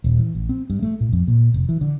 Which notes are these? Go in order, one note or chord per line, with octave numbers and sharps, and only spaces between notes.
D#1
E3
A1
C4
G2
A3
A2
F2
A#2
F1
E3
D3